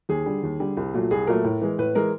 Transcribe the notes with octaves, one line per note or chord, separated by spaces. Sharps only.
D#2 G#4
D3 G3
D#2
D3 G3
C2
A#2 F#3 A3
C2 G#4
A#2 F#3 A3 A#4
A2
E3 G#3
A2 B4
E3 G#3 A#4